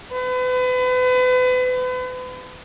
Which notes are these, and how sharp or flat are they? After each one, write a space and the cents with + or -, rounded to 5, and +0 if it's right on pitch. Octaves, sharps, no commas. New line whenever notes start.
B4 +35